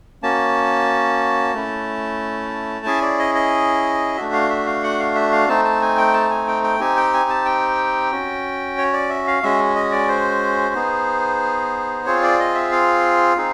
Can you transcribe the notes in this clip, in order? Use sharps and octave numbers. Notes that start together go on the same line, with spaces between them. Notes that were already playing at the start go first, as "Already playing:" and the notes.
A#3 C#4 F#4 A5
A3 C#4 E4
C#4 E4 G#4 G#5
D5
D#5
D#5
A3 D4 F#4 E5
F5
E5
F5
F#5
F5
E5
F5
A3 C4 D#4 A5
A5
G#5
G5
A5
G#5
G5
G5
C4 D#4 G4 G#5
G5
G#5
A5
G5
C#4 F#4
C#5
D5
E5
F5
G#3 C#4 F#4 E5
D#5
D5
C5
B3 D#4 G#4
C4 F4 G#4 C#5
D5
D#5
E5
F5
C4 D#4 G#4